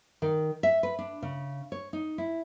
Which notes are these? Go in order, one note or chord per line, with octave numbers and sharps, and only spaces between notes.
D#3
E5
B4
D4
C#3
C#5
D#4
E4